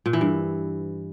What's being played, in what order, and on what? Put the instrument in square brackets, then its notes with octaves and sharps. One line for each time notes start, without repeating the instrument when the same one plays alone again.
[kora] A#2
E3
G2